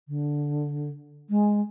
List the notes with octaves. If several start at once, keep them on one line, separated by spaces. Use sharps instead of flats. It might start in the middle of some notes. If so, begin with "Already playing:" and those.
D3
G#3